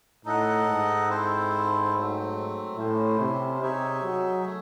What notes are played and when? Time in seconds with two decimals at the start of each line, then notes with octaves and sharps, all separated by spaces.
0.25 A2 D#4 A4 D#5 F#5
0.67 G#2
1.09 C4 E4 A4 C5
1.93 F#3 A3 C4
2.77 A2 C#4 E4 C5
3.19 C3
3.61 C3 D#4 G#4 C#5 E5
4.03 F#3
4.45 A3